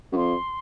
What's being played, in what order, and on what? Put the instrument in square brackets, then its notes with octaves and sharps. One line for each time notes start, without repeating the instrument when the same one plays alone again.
[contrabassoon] F#2
[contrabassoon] F2 [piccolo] C6